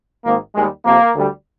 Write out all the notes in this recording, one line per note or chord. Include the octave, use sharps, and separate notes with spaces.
G#1 G#2 D#3 A#3
D#2 D#3 G3 G#3
F2 C3 F3 A#3
D2 D3 G3